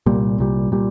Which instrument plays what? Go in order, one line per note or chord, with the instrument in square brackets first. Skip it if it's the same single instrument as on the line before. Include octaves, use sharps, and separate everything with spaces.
[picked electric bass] C2 A#2 G3
C2 A#2 G3
A#2 G3